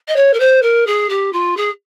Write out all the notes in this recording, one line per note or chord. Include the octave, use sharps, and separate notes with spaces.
D#5
C#5
A#4
C5
A#4
G#4
G4
F4
G#4